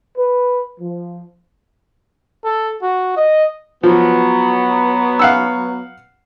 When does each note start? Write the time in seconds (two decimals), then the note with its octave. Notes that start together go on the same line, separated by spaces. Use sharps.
0.17 B4
0.80 F3
2.45 A4
2.82 F#4
3.17 D#5
3.83 F3 F#3 B3
5.19 F5 F#5 E6